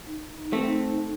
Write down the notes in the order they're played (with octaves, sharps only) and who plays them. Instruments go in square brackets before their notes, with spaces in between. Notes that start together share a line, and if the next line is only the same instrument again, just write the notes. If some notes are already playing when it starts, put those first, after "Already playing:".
[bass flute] D#4
[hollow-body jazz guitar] A3 C4